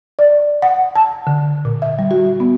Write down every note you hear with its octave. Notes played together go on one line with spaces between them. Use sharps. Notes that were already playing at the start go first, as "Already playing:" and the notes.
D5
F#5
A5
D3
A#2
E5
G3
F#4
B3